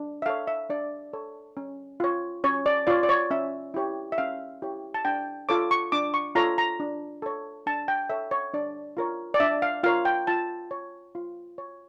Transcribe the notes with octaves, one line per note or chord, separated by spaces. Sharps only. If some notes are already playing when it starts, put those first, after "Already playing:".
Already playing: D4
E5
A4 C#5 F5
E5
D4 D5
A4 C#5
C#4
F4 C#5
C#4 C#5
D5
F4 C#5 D5
D5
C#5
C#4 E5
E4 G4 C#5
E5
C#4 F5
E4 G4 C#5
A5
D4 G5
F4 A4 C#5 D6
C#6
D4 D6
C#6
F4 A4 C#5 A#5
A#5
D4
A4 C#5
D4 A5
G5
A4 C#5 E5
C#5
D4 D5
F4 A#4 C#5
D5
D4 E5
F5
F4 A#4 C#5 F5
G5
F4 A5
C#5
F4
C#5